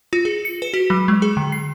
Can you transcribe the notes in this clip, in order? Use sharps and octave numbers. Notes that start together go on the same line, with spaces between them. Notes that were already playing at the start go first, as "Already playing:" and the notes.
F4
G#4
C#7
B4
F#4
F#3
G#3
G#4
D3
C7